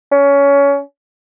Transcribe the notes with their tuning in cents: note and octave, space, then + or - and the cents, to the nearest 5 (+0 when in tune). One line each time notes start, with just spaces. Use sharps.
C#4 +20